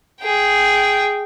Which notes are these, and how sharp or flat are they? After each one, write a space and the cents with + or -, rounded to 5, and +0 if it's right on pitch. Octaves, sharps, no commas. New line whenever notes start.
G#4 +0 G5 -10